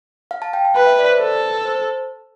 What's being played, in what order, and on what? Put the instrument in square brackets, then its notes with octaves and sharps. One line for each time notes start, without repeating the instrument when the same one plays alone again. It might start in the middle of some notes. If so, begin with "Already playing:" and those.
[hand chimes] F5
A5
G5
A5
[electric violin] B4 [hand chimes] B5
[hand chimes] E5
D5
C5
[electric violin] A4 [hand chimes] B4
[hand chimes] C5